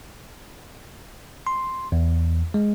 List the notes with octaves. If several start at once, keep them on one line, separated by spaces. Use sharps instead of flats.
C6
E2
G#3